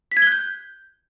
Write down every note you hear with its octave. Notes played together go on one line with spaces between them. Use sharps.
B6
G#6
G7
F#6
G6